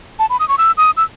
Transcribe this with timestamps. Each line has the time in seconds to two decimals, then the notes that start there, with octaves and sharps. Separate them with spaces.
0.19 A5
0.30 B5
0.40 D#6
0.48 C#6
0.58 E6
0.77 D#6
0.97 E6